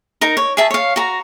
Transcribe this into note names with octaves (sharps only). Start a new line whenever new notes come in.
D#4 A#4 A#5
C#5
G#4 E5 A5
C#5 F5
F#4 A#5